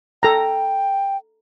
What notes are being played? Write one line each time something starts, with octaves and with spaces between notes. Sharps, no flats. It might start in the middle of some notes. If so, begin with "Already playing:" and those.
A4 G5 A#5